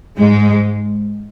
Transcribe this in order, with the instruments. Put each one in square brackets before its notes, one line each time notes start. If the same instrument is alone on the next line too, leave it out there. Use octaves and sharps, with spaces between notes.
[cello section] G#2 G#3